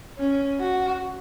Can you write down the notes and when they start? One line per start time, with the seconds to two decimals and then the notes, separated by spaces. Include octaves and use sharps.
0.18 C#4
0.60 F#4